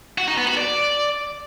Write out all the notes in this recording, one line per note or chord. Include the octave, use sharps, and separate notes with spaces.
F#4
D#4
B3
F#4
D5